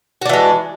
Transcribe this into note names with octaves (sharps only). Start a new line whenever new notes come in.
E3 G#3 D4 F#4